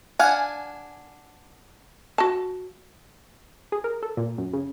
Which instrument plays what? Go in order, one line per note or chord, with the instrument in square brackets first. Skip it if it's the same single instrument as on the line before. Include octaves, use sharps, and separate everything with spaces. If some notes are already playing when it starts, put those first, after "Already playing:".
[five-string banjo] D4 F5 F#5 [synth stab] G#5
[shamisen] F#4 A5
[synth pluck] G#4
A#4
A4
A#2
F#2
C#3